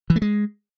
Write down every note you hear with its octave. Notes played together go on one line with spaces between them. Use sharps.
E3
A3
G#3